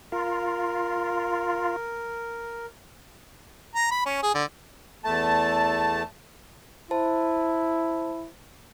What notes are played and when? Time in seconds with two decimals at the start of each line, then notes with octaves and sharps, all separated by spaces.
0.12 F4 A#4
3.75 A#5
3.91 B5
4.06 C#4
4.23 G#4
4.35 D3
5.04 E2 A3 A5
6.91 E4 C5 A5